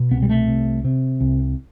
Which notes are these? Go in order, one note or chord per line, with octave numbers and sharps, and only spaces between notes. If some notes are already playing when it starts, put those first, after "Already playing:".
Already playing: B2
C2 B3
G3
A3
C3
C3
C2